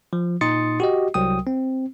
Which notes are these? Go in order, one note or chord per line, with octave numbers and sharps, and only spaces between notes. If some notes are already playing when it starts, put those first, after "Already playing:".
F3
A#2 D#4 C6 D#6 A6 C#7
F#4 G4 D#5
C2 F#3 G5 D#6
C4